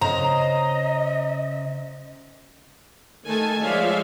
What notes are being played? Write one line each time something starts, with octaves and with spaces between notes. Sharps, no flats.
C#3 C5 D#5 A#5
D#3 A3 A4 G#5 A5
F3 G#3 C#5 D5 E5 F5